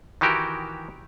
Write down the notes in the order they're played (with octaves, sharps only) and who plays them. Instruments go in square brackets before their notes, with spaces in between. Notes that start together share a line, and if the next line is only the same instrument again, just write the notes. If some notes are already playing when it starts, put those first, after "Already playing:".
[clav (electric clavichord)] D#3 E3 F#4 G4 A#4